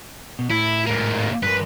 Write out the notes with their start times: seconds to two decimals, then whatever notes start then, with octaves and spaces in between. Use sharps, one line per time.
0.39 B2
0.50 A2 E4
0.86 G#2 A#3
1.43 G2 A#4 B4